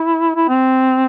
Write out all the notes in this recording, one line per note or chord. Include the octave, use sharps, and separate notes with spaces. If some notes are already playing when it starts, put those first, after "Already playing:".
Already playing: E4
E4
C4